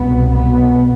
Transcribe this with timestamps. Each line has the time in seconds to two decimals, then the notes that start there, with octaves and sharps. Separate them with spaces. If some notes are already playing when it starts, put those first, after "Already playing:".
Already playing: C2 B2 B3
0.32 B2 B3